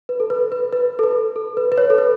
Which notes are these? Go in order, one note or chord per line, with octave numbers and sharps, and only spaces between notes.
B4
A4
B4
B4
B4
A4
B4
A4
B4
B4
C#5
A4
B4